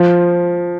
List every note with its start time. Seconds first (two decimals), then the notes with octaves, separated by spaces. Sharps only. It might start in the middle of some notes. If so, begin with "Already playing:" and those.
Already playing: F3